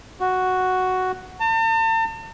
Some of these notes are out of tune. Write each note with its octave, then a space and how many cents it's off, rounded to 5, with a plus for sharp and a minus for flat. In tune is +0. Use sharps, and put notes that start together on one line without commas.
F#4 +0
A5 +40